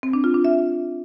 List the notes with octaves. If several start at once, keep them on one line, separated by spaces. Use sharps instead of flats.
C4
D4
F4
D4
E5